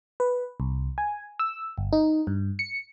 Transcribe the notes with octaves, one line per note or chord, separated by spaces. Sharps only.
B4
C2
G#5
E6
G1
D#4
G2
C#7